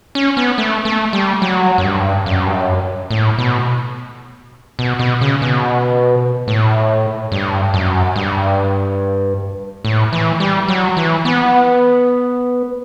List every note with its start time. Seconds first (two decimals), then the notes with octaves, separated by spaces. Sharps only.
0.15 C#4
0.37 B3
0.58 A3
0.85 A3
1.13 G3
1.42 F#3
1.78 F#2
1.83 G2
2.26 F#2
2.46 G2
2.54 F#2
3.11 A2
3.38 B2
4.79 B2
4.99 B2
5.21 C#3
5.42 B2
6.48 A2
7.32 G2
7.74 F#2
8.16 G2
9.85 A2
10.13 E3
10.40 G3
10.68 F#3
10.97 E3
11.25 B3